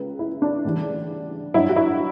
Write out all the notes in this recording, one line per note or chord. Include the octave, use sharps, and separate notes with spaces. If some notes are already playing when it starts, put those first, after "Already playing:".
Already playing: C#2 C#3 B4
E4
D4
D2 C#3 E3 G3
G2 F#3 E4
F#4
E4